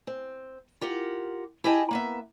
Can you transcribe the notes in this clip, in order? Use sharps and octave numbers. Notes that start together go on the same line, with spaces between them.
C4
F4 G4 A#4 F#5
E4 G4 G#4 D#5 G5 A5
A#3 B3 E5